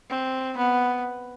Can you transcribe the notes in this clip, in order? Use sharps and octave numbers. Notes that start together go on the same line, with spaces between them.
C4
B3